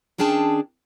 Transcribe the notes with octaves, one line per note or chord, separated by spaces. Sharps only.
D#3 C#4 D4 G#4 G5 A5